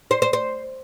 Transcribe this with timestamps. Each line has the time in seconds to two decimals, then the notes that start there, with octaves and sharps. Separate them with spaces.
0.11 C5
0.22 C5
0.33 C5